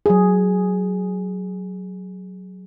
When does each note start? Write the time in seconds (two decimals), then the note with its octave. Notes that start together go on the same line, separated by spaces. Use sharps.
0.06 F#3 G#4